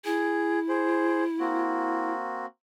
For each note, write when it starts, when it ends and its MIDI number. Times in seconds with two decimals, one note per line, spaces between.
0.05 2.13 64
0.05 0.59 68
0.69 1.24 68
0.69 1.24 72
1.40 2.46 58
1.40 2.46 60
1.40 2.46 66